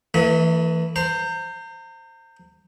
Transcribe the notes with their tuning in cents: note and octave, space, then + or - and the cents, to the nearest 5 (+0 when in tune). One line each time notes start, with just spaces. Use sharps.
E3 +0 A3 +45 E5 -45
C5 +0 A#5 -35